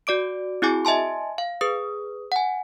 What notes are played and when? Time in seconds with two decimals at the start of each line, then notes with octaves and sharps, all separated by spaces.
0.07 F#4 D5 D6 D7
0.62 C4 E4 F#4 G#4 G#5 D6
0.85 D#5 E5 G#5 A5 C6
1.38 F5
1.61 G#4 B4 D#6
2.32 F#5 G#5